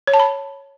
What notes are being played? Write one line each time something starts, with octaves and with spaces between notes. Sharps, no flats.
C#5
A5
B5